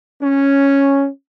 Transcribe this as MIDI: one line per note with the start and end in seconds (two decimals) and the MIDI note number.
0.21 1.07 61